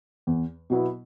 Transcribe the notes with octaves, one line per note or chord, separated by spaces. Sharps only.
E2
B2 F#3 B3 E4